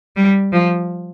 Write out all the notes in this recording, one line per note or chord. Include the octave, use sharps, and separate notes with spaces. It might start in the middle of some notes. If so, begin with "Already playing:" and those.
G3
F3